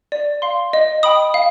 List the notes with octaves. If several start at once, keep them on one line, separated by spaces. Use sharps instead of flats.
D5
F5 C6
D#5
G5 B5 D#6
F5